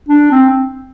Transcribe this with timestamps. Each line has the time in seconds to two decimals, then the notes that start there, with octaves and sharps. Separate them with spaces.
0.09 D4
0.31 C4